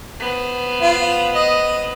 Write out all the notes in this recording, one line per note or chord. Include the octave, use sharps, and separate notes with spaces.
B3 C5
F4
D#5